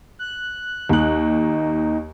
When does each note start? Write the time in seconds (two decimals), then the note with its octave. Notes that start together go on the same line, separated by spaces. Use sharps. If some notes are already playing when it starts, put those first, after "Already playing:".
0.19 F#6
0.89 D#2 D#4 F#6